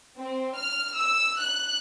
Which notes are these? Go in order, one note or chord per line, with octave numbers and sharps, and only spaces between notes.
C4
F6
E6
F#6